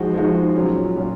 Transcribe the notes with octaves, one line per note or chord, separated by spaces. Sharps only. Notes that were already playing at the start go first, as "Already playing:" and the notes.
Already playing: F3 G#3 D#4 F#4
F3 G#3 D#4 F#4
A#2 F#3 C#4 F4
A#2 F#3 C#4 F4